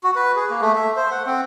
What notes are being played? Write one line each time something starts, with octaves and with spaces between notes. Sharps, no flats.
F#4
B4
G#4
A#3
A3
E5
C5
F#5
C4